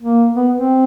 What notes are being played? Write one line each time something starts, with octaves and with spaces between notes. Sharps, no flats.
A#3
B3
C4